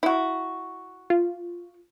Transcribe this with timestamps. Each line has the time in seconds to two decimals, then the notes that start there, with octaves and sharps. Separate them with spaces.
0.03 E4 F#4
1.10 F4